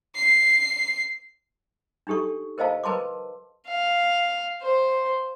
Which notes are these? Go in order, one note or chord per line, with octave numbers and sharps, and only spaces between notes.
C7
D4 D#4 G4 A4 C#6
A#4 C5 D#5 F5 A5
A#4 B4 A5 C6 D6
F5
C5